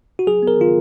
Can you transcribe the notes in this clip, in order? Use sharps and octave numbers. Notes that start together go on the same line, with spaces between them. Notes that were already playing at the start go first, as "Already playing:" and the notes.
F#4
F#3 G#4
B3 A#4
D#3 F4